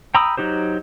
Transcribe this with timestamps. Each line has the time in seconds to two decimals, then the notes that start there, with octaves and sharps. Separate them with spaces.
0.15 G5 A#5 B5 D#6 E6
0.37 F#3 D#4 G4 C5